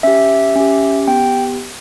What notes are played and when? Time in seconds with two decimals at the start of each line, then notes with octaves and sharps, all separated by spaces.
0.03 C#4 G4 E5
0.55 C#4 G4
1.07 B3 G4 G5